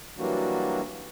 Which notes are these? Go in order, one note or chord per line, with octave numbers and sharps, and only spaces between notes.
E3 F#3 G3 A#3 D4 F#4